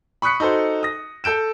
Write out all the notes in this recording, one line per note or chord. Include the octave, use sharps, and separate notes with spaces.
B5 C#6 D#6 F#6 B6 C#7
D#4 F#4 A4 C5
D#6 A#6
A4 G6 D7 E7